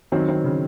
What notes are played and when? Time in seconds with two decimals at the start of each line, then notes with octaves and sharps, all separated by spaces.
0.12 D#3 F#3 C4
0.28 C4
0.44 C#3